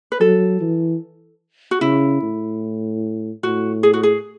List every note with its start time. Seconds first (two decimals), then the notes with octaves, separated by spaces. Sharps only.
0.12 B4
0.20 F#3 A4
0.61 E3
1.71 F#4
1.81 C#3 E4
2.22 A2
3.43 A2 F#4
3.83 G#4
3.93 F#4
4.03 G#4